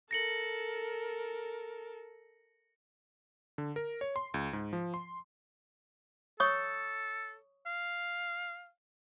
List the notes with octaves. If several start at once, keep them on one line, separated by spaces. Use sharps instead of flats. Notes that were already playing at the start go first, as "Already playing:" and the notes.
A4 A#4 A#6 C#7 F#7
D3
A#4
C#5
C6
C#2
G#2
F3
C6
A4 C#5 C#6 D#6
F5